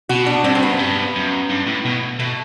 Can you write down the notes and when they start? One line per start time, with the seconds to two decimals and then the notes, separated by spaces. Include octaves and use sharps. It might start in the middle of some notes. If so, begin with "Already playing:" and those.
0.09 B2 F#4
0.26 D4
0.44 G2 C4
0.55 C4
0.63 B3
0.72 F#2
0.79 G2
1.15 F#2
1.49 G2
1.66 A2
1.85 B2
2.19 B2 A3